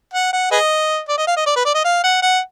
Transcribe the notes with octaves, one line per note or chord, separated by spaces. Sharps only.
F#5
F#5
G#4 B4 D#5
D5
D#5
F5
D#5
D5
B4
D5
D#5
F5
F#5
F#5